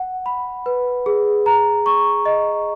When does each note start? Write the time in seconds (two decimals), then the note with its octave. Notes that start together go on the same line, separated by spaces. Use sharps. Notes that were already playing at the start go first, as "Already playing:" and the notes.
Already playing: F#5
0.26 B5
0.66 B4
1.06 G#4
1.46 A#5
1.86 C#6
2.26 D#5